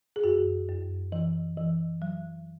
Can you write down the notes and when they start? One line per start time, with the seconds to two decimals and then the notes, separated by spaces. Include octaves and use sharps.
0.16 G#4
0.24 F#2 F#4
0.69 F#2
1.12 E3
1.57 E3
2.02 F#3